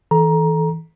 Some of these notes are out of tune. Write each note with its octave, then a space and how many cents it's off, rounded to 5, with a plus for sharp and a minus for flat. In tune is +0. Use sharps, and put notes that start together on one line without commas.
E3 -35 A4 -20 A#5 +15